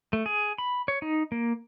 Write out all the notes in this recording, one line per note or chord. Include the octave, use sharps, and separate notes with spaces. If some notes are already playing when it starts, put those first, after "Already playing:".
A3
G#4
B5
C#5
D#4
A#3